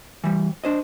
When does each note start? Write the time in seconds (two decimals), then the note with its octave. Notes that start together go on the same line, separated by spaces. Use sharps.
0.24 E3 G3
0.64 D4 C5 D#5